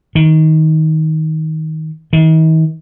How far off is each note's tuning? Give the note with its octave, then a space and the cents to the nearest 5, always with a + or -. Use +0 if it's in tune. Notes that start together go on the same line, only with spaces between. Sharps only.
D#3 +20
D#3 +45